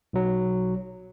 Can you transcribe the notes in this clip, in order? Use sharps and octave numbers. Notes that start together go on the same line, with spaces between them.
B1 F#3